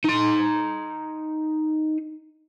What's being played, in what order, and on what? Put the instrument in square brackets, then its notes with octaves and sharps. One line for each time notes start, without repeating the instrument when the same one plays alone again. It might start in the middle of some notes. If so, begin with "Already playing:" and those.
[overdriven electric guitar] D#4 C6